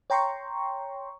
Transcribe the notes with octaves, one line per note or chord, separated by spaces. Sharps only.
C#5 G5 A#5 C6 C#6